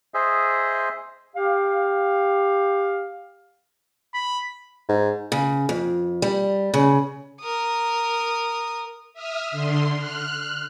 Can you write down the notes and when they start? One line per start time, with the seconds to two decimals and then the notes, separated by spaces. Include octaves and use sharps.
0.14 G#4 C5 D#5 E5
1.36 G4 F5
4.15 B5
4.89 G#2
5.32 C#3
5.69 F2
6.22 G3
6.74 C#3
7.41 A#4 D#6
9.13 E5 D#6 F6
9.51 D3 C6
9.97 F6 F#6